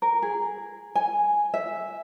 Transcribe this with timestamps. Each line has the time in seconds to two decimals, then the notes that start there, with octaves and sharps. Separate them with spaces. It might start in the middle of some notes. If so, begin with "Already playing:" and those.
0.02 A#4
0.22 G#4
0.95 G#5
1.54 E5